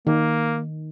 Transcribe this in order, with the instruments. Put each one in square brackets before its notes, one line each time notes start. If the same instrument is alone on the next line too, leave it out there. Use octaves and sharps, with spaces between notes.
[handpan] D#3 [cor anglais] A#3